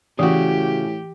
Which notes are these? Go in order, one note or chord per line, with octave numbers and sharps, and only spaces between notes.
A2 C#3 E3 F#4 G4